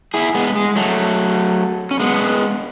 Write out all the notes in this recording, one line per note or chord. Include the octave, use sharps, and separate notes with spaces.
E4 G#4
G#3 B3
G#3
F#3 A3
C#4
G#3 B3